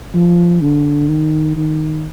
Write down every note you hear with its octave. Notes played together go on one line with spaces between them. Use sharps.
F3
D3
D#3
D#3